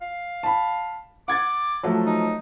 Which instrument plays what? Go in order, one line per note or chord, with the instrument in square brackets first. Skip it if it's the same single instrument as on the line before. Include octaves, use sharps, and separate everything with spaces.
[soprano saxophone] F5
[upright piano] A5 B5
[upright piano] F#5 G#6 A6 [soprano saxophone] D6
[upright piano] F3 F#3 A3
[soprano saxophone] D#4